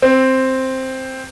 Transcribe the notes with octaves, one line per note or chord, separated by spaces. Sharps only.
C4